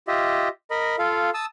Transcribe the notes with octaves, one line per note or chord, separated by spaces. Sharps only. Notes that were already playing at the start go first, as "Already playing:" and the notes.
F4 G4 D#5 E5
A#4 D#5 B5
F4 A4 F5
A5 D#6 E6